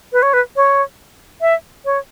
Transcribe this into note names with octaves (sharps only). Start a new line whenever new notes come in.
B4
C#5
B4
C#5
E5
C#5